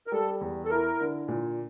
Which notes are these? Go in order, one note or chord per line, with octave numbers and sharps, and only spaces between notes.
A#4
G3 A4
E2
A4
E4 A#4
D3
A#2